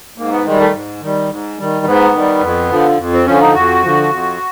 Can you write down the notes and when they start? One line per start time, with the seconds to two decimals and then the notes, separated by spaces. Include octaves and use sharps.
0.18 G#2 A#3
0.32 B3
0.45 D#3 G3 G#3
0.59 A3
0.73 G#2
1.01 D#3 G3
1.30 G#2
1.58 D#3 G3
1.86 G#2 B3
2.14 D#3 G3
2.42 F2
2.70 D3 F3
2.98 F2
3.13 C4
3.26 D3 F3 C#4
3.41 D#4
3.54 F2 F#4
3.82 D3 F3
4.10 F2